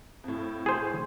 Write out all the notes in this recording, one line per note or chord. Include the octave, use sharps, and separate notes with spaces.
F2 A2
G#4 C5